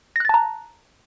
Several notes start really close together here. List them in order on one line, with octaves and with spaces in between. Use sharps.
A#6 F#6 A6 A5 A#5